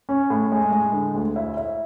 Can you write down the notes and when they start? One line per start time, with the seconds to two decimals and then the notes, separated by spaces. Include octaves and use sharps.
0.09 C#4
0.30 A2
0.52 G#3
0.72 G#3
0.93 D3
1.15 D2
1.36 E4
1.57 E4